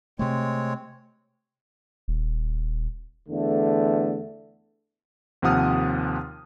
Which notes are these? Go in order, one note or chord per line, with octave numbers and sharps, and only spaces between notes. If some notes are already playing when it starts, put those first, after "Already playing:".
C3 G#3 A3 C4 C#5
D#1
E2 D3 A3
D#2 C3 F3 F#5 D#6 F6